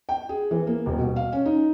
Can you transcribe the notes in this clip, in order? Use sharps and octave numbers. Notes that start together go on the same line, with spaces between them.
G5
G#4
E3
A#3
D#1
B2
F5
C#4
D#4